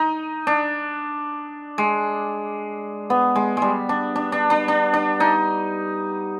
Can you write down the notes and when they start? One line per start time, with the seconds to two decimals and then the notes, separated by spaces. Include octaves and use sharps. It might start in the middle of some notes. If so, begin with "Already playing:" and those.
Already playing: D#4
0.47 D4
1.78 G#3
3.10 B3
3.36 G#3
3.57 G3 G#3
3.89 D4
4.16 D4
4.32 D4
4.50 D4
4.68 D4
4.94 D4
5.20 D#4